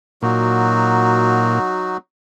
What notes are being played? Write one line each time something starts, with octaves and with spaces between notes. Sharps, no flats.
A#2 F#3 D#4 F#4